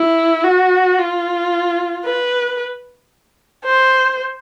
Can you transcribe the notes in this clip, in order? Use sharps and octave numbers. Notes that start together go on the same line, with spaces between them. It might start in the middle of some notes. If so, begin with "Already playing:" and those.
Already playing: E4
F#4
F4
B4
C5